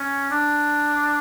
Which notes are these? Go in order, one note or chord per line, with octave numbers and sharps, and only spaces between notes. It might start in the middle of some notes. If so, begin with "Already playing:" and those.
Already playing: C#4
D4